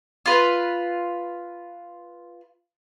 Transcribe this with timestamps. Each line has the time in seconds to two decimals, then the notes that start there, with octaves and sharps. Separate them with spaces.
0.26 F4 B4